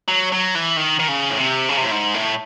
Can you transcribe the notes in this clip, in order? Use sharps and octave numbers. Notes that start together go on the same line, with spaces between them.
F#3
F#3
E3
D#3
D#3
C#3
A2
C3
C#3
C3
A2
G#2
A2